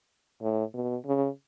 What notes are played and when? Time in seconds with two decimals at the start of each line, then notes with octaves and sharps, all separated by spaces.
0.42 A2
0.74 B2
1.06 C#3